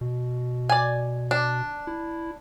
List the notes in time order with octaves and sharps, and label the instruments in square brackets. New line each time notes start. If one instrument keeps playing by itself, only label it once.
[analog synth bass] B2
[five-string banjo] D5 G#5
D4
[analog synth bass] E4